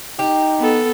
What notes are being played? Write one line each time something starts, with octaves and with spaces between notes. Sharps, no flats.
D#4 G4
B3 A4